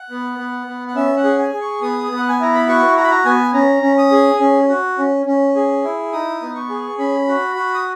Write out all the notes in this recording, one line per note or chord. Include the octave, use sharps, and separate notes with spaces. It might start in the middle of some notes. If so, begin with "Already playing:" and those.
Already playing: F#5
B3
B3
B3
F#5
C#4 E5
F#5
G#4
G#5
G#4
C#6
B3 D#6
B3
F#5
G#5
E4 A#5
B5
F#4 C#6
F#4 A#5
B5
A#5
B3 G#5
C#4 A#5
C#4
D#6
G#4
C#4
F#4
C#4
C#4
G#4
E4
D#4 D#6
B3
C#6
G#4
C#4 B5
F#4
F#4
D#6